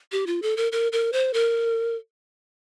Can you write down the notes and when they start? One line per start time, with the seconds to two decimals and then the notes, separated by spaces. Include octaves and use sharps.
0.12 G4
0.27 F4
0.42 A4
0.57 A#4
0.72 A#4
0.92 A#4
1.13 C5
1.33 A#4